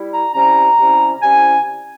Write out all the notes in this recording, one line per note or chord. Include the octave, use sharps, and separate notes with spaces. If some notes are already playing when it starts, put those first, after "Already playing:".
Already playing: G3 E4
A#5
C3 G3 C#4 E4 A#5
C3 G3 C#4 E4
C3 G3 C#4 E4 G#5